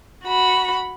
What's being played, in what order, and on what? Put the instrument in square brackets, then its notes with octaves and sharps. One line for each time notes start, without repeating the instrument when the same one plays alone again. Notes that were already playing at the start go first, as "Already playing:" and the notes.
[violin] F#4 B5